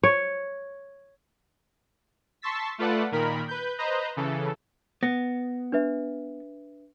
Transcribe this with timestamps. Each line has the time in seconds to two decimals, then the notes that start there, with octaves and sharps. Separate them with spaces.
0.03 C#5
2.42 A5 C6 C#6 E6 A6 B6
2.78 A3 F4 A4 B4 D5 F#5
3.12 A#2 D#3 A#4 B5
3.48 B4 G6
3.78 B4 C5 D#5 A#5 G6
4.17 C#3 E3 A4
5.03 B3 A#6
5.72 D4 B4 E5